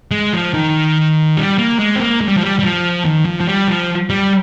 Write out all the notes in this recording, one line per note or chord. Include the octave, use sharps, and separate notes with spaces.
G#3
F3
D#3
G3
A#3
G#3
C4
A#3
G#3
G3
F3
G3
G3
F3
D#3
F3
F3
G3
F3
G3